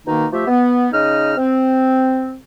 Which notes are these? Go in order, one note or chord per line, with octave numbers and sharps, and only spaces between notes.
B2 D#3 A#3 D#4
F3 A3 G4 E5
B3
C#3 D#4 D#5 F6
C4